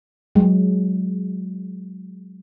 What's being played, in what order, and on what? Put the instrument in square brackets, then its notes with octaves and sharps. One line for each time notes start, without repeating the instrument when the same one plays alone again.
[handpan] F#3 G#3